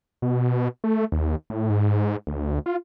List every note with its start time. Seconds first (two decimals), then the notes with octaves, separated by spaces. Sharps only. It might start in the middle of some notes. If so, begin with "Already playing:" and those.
0.22 B2
0.84 A3
1.12 D#2
1.50 A2
1.70 G#2
2.27 D2
2.66 F4